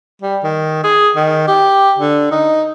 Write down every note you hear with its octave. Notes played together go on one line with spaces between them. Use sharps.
G3
D#3
G#4
D#3
G4
D3
D#4